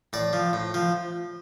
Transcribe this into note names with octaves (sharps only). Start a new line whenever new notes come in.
A2 D5
F3
A2
F3